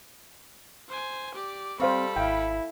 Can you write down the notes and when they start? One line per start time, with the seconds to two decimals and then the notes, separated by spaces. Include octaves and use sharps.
0.89 C5 G#5
1.35 G4 D5
1.80 G3 C4 A4 C5 F5 B5 C#6
2.16 G#1 E4 F5 G5